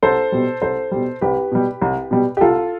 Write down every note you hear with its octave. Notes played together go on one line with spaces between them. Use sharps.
C2 A4 C5
B2 G3
C2 A4 C5
B2 G3
C2 G4 B4
B2 G3
C2
B2 G3
G4
C2 F4 A4